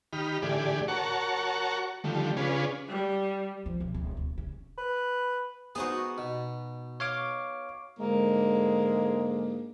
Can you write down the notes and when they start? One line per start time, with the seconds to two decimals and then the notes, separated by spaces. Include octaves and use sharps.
0.13 D#3 D#4 G4 B5 F6
0.42 A2 D3 E3 G4 G#4 D5
0.88 F#4 A#4 C#5 F#5 A5 C#6
2.04 D3 D#3 F3 G3 A3
2.37 C#3 C#4 D4 F4 G#4 B4
2.89 G3
3.66 F3
3.80 B1
3.94 D1
4.17 D1
4.38 C#3
4.78 B4
5.75 B3 D#4 F#4 G#4 C5
6.18 B2
7.00 C#5 F5 D6
7.98 G#2 D3 G#3 A#3